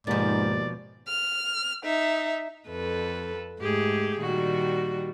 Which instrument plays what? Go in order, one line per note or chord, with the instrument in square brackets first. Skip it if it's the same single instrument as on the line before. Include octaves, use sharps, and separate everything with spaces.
[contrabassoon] D#2 [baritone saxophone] G#2 [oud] B2 F3 [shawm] D5
[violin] F6
D#4 E5
[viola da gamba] F2 A4 B4
[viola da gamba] G#2 A3 [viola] G4 G#4
[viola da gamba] A#2 D#3 G3 [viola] F#4